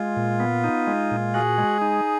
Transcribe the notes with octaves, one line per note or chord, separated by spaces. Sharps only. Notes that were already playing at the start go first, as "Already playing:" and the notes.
Already playing: G#3 F4
A#2
B3
D#4
G#3
A#2
F#4 G#4
G#3
D#4